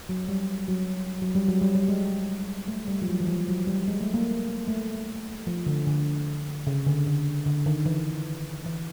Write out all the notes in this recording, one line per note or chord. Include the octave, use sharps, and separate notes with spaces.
F#3
G3
F#3
F#3
G3
F#3
G3
G3
G#3
A3
G3
F3
F#3
E3
F3
F#3
G3
G#3
A3
A#3
A3
F3
D3
D3
C#3
D3
D3
D3
D#3
E3
E3